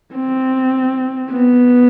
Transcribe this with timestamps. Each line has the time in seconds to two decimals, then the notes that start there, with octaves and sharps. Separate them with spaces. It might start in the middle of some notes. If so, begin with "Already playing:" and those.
0.15 C4
1.31 B3